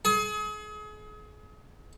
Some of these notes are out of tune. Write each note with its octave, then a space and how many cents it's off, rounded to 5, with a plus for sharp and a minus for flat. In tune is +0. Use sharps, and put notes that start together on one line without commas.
G#4 +35